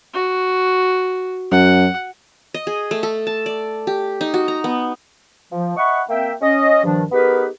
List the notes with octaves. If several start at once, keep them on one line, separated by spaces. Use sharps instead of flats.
F#4
F#2 F#5
D#5
G#4
A3
A4
A5
D5
G4
D#4
F#4
A#5
B3
F3
D#5 E5 F#5 B5 C#6
A#3 C4 E5 G5
C#4 D#5
G2 D#3 F3 D4
B3 D#4 G4 G#4 A#4 B4